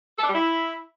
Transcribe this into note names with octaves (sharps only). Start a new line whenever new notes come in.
A4
D4
G3
E4